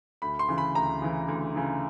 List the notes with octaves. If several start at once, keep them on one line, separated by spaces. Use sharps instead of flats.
D2 B5
C6
C#3 E3
B5
D2 A#5
C#3 E3
D2
C#3 E3